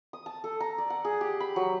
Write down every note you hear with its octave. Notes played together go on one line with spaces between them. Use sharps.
D#6
A5
A4
A#5
D5
F#5
G#4
G4
B5
F#3